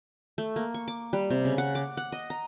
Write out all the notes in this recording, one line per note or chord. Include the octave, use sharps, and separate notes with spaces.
A3
A#3
C#6
D6
G3
C3
C#3
F#5
D6
F#5
D#5
A#5